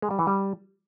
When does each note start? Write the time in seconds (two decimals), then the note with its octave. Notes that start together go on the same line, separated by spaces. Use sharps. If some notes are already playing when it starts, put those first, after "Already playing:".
0.02 G#3
0.11 G3
0.19 E3
0.27 G3